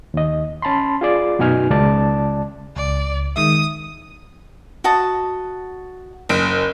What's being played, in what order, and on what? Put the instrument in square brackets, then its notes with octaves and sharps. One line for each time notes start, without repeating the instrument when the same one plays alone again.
[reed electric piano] D#2 D#5
C#4 A5 B5 C6
F4 G#4 D5
F#2 B2 D#4 G#5 F6
C#2 G#3 D5 A5
[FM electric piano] C#2 [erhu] D5
[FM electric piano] D#3 G#3 E5 [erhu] D#6
[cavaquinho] F#4 D#5 A5
[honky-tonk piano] F#1 D7